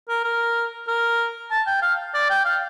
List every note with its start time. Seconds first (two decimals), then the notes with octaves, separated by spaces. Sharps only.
0.09 A#4
0.24 A#4
0.87 A#4
1.51 A5
1.67 G5
1.82 F5
2.14 D5
2.30 G5
2.45 F5